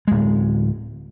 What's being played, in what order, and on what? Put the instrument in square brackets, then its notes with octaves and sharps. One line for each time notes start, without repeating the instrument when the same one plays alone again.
[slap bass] D1 G#3